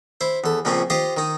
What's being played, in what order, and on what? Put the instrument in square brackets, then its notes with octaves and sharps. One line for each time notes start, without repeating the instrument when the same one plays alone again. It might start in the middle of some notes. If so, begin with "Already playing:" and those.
[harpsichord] E4 C5
E2 A4
C#2 A#2 F3 C4 C#4
F4 G4 C5 D#5 F5
D#3 D#4